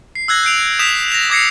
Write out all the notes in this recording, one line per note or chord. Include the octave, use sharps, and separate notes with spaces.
C7
E6 F#6 G#6 A#6
G6 C7 D7 F7
D#6 G6 B6 E7 F7
A#6 F7
D6 D#6 G#6 A#6 C7 C#7